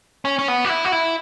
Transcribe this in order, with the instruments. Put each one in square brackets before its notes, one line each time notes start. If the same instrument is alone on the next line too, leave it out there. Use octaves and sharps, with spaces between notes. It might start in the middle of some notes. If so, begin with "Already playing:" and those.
[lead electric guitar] C#4
C#4
B3
F#4
E4
F#4
E4